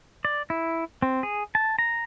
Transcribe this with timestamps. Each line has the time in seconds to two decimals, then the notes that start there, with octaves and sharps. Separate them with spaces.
0.25 D5
0.50 E4
1.02 C4
1.23 G#4
1.55 A5
1.79 A#5